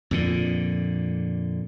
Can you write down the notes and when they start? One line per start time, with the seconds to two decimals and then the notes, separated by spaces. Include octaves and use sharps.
0.11 F2 A#2 D3